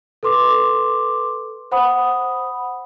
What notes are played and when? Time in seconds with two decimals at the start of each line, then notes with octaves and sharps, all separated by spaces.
0.23 A4 B4 C6 D6
1.71 C5 F#5 B5 D#6